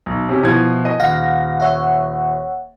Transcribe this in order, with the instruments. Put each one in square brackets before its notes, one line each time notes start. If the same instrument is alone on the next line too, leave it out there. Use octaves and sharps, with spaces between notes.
[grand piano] B1
C3 C#4 G4
[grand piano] B2 F3 G#6 [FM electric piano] E4
[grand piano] D#5
[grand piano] D#1 [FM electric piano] F5 F#5 A#6
[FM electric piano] C#5 E5 F#5